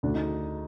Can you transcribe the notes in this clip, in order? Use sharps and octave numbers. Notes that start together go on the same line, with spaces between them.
D2 D4
D#4